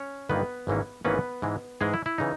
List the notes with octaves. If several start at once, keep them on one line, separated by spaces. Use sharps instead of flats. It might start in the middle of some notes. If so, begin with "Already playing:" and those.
Already playing: C#4 C#5
G1 G2 D#3 A#3 B3 B4
G#1 G#2 E3 A#3 C#4
G#1 G#2 E3 A#3 B3 C#4 B4
G#2 E3 G#3
G#2 E3 G#3 G#4
E4
E4
C#3 E3 D#4